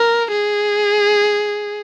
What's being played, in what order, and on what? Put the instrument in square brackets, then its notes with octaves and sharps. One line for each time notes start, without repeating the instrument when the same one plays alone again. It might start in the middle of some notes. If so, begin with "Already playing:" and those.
Already playing: [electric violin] A#4
G#4